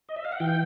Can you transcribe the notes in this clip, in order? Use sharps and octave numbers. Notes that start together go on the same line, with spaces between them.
D#5
E5
F5
F#5
E3 G5